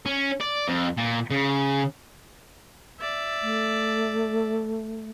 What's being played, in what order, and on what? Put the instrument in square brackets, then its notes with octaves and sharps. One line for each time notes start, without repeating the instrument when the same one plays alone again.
[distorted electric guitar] C#4
D5
F2
A#2
C#3
[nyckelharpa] D5 E5
[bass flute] A3